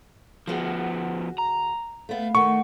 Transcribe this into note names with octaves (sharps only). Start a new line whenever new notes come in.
D2 F3 B3 F#4 G#4
A#5
A3 B3 F5
D#3 A3 F#5 C#6